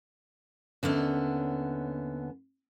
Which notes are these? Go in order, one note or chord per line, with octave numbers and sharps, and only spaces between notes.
D#2 D3 B3 C#4 E5